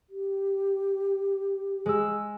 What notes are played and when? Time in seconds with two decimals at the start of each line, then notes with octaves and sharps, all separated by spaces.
0.09 G4
1.86 G#3 E6